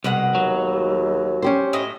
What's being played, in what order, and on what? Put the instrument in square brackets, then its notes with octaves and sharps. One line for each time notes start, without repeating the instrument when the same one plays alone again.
[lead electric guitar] C2 [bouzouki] B2 G#3 F#5
[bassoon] D#2 [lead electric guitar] F#3
[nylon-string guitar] C#4 G4 C5
[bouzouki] A2 D#5